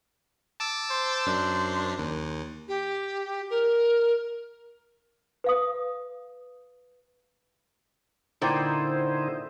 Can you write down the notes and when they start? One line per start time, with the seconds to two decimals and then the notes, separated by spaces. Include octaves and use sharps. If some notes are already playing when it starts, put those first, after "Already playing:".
0.60 A5 D6 E6
0.91 C5
1.26 F#2 D4
1.98 D#2
2.68 G4
3.50 A#4
5.44 B4 F5 D#6
8.42 A#2 D3 D#4 E4 C5 G5